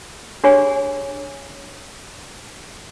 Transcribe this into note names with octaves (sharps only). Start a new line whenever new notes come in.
D4 G4 G#4 C#5 G#5